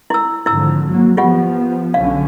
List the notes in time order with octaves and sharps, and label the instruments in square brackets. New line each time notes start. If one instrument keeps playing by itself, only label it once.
[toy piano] E4 E6
[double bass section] G#1 D3 F3 [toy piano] E4 E6
[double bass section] F#3 A#3
[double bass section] F3 B3 [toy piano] F4 G4 F#5
[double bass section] B1 D3 C#4 [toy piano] F5